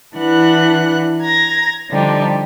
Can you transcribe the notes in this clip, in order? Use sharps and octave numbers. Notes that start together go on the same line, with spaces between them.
E3 D4 F#5 F#6
A#5 G#6 A#6
D3 F3 G3 D4 D#4 G4